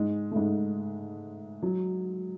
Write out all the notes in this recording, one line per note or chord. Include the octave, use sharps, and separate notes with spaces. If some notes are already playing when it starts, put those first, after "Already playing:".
Already playing: G#2 G#3
A3
G#2 G#3
F#3